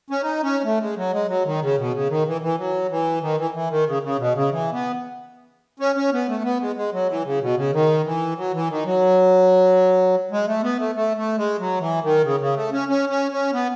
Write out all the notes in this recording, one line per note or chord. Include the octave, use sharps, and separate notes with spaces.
C#4
D#4
C#4
A3
G#3
F#3
G#3
F#3
D#3
C#3
B2
C#3
D#3
E3
E3
F#3
E3
D#3
E3
E3
D#3
C#3
C#3
B2
C#3
E3
B3
C#4
C#4
B3
A3
B3
G#3
G#3
F#3
E3
C#3
B2
C#3
D#3
E3
F#3
E3
D#3
F#3
G#3
A3
B3
A3
A3
A3
G#3
F#3
E3
D#3
C#3
C#3
A3
C#4
C#4
C#4
C#4
B3